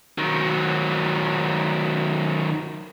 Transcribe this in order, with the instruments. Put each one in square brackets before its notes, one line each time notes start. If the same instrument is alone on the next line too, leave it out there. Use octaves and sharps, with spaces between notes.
[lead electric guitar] D#3 F#3